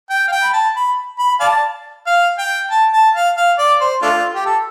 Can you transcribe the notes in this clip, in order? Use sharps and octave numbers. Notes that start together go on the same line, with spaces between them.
G5
F5
G5
B5
A5
B5
B5
D5 F5 A5
F5
G5
A5
A5
F5
F5
D5
C5
A3 D4 F4
G4
A4